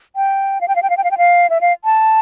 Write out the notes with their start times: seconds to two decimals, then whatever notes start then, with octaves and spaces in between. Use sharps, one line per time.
0.16 G5
0.61 F5
0.68 G5
0.76 F5
0.83 G5
0.90 F5
0.97 G5
1.04 F5
1.11 G5
1.18 F5
1.50 E5
1.61 F5
1.85 A5